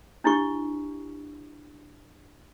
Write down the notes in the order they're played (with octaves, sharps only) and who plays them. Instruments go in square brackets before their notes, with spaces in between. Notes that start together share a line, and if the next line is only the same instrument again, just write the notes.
[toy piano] D4 E4 G4 C#6